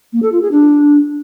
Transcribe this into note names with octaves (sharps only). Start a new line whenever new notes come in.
A#3
A4
F4
G#4
D4